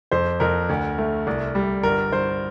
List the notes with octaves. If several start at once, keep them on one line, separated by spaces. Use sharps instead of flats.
F2 C5
F2 A#4
D2
A3
C2
G3
G1 A#4
G1 C5